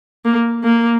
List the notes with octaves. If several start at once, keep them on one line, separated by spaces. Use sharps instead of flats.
A#3
A#3